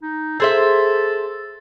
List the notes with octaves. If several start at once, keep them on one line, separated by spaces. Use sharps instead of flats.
D#4
G#4 A4 C5 E5